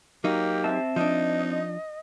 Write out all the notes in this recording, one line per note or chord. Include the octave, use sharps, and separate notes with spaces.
F#3 A#3 D#4 G4
C4 E5 A5
F3 D4 D#4 D#5